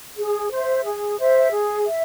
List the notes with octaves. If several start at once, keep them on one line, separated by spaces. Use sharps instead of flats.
G#4
C5 E5
G#4
C5 E5
G#4
E5